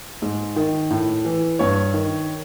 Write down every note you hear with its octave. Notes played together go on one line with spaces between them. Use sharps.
G#2
D#3
A2
E3
G2 C#5
D#3